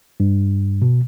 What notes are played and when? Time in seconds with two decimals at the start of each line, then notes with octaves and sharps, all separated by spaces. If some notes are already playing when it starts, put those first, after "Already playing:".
0.20 G2
0.82 B2